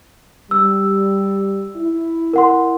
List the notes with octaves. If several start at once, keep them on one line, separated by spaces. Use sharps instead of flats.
G3 E6
E4
A#4 F#5 C6